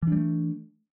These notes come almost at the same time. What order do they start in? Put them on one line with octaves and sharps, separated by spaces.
E3 D4 G3 A3